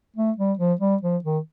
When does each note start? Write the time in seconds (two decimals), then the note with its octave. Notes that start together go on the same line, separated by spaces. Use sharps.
0.16 A3
0.38 G3
0.59 F3
0.81 G3
1.02 F3
1.24 D#3